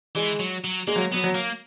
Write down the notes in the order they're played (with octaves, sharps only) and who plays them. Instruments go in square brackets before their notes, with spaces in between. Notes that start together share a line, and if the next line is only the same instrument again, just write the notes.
[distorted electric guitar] E3 [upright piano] G#3
[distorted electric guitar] F#3
F#3
[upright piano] G#3 [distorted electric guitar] A#3
[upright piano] F#3
[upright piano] F#3 [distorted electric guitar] B3
[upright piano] F#3
[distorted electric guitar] A#3